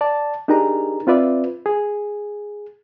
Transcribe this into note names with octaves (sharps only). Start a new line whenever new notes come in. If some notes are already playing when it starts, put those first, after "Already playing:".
D5 A5
D4 D#4 G4 G#4 A#4 A#5
C4 F4 B4 D5 E5
G#4